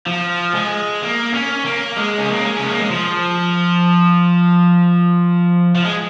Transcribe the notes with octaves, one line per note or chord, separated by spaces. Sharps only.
F3
G#3
A#3
C#4
A#3
G#3
C#4
A#3
G#3
C#4
A#3
G#3
F3
F3
G#3